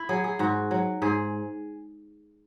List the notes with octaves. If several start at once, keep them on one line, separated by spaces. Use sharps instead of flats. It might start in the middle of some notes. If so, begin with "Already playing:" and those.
Already playing: E4
F#3 G#4
G#4
G#2 F#4
F#3
G#2 G#4